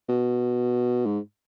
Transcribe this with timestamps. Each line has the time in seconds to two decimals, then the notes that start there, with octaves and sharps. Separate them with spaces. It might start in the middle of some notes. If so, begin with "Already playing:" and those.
0.09 B2
1.06 G#2